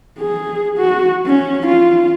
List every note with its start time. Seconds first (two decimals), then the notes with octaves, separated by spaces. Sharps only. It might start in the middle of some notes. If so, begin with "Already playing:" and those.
0.19 G#4
0.78 F#4
1.27 C#4
1.67 F4